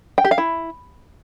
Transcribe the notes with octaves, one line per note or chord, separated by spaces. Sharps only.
G5
G4
F5
E4